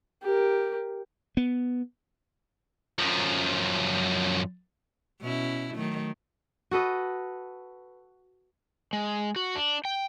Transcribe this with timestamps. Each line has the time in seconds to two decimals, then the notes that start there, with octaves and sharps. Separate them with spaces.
0.23 G4 A#4
1.37 B3
2.98 F#2 F3
5.21 B2 C#4 E4
5.74 D#3 F#3 A3
6.71 F#4 A4 B4 D#5
8.93 G#3
9.36 F#4
9.55 D4
9.85 G5